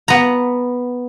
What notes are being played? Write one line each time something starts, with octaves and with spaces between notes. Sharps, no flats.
B3 A#5